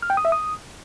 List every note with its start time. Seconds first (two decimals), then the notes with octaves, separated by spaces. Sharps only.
0.02 F6
0.10 G5
0.17 D#6
0.25 E5
0.32 D#6